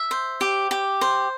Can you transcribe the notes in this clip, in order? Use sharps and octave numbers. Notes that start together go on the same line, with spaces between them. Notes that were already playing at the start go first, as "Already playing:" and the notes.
Already playing: E5
C5
G4
G4
C5